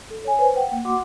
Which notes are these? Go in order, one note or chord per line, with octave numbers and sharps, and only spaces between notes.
A4
C#5 G#5
B4 C5
F#5 G5
A#3
F#4 F#5 C6 D6